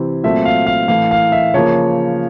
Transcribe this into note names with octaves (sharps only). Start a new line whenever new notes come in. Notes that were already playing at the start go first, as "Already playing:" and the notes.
Already playing: C3 E3 C4
A#2 F#3 A3 C4 E5
F5
F5
A2 E3 A3 F5
F5
E5
C#3 F3 A#3 C#5